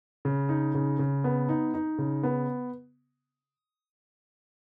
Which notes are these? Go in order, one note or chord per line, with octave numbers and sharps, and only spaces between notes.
C#3
D#4
C#3
C#3
B3
D#4
D#4
C#3
B3